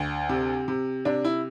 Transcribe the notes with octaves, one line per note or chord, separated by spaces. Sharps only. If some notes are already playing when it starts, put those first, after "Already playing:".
Already playing: D2
C3
C3
C3 D4
E4